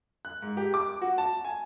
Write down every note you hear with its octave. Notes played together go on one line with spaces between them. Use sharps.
F#6
G#2
G4
D6
F#4
A5
G#5